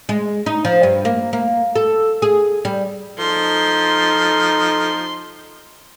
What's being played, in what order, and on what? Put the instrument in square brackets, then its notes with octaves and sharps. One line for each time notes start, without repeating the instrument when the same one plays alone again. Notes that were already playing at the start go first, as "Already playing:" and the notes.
[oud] G#3
D#4
F3
G2
A#3
A#3
A4
G#4
G3
[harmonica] F3 [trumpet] D#4 [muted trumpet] A4 [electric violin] C6